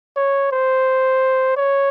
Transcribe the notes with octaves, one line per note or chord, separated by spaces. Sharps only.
C#5
C5
C#5